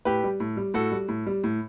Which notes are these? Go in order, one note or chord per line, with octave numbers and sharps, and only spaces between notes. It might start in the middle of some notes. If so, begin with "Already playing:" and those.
A2 G4 B4
G3
A2
G3
A2 F#4 A4
G3
A2
G3
A2